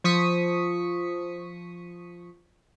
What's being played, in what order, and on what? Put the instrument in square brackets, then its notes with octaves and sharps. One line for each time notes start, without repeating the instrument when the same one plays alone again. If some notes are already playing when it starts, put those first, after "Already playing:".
[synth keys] F3 C#6 D#6 B6 C#7